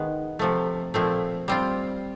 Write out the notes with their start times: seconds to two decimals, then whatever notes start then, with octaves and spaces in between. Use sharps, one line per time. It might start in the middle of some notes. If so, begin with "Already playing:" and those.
Already playing: D#3 G#3 B3
0.39 C3 F3 A3
0.94 A#2 F3 A3 C4
1.48 G3 C4 F4